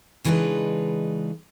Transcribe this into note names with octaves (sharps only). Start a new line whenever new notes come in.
C#3 E3 G#3 D4 D#4 B4